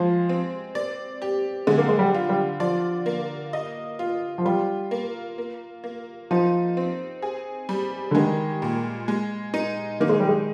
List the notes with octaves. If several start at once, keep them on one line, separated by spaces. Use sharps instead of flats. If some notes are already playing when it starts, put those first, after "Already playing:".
Already playing: F3 G#3
C4
D5
G4
D3 G#3
A#3
G#3
G3
F4
G3
F3 D5
A#3
D#5
F4
F3
G3 F4
A#3
A#3
A#3
F3 D#4
C4
G#4
G3
D3
D#3 G#3
A#2
G#3
D#4
D#3 A#3
G#3
G3
G#3